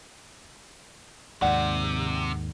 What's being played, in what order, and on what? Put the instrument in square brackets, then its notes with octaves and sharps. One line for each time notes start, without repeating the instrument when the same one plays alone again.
[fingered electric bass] D#2 G#2 [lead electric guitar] C3 [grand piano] D5 F#5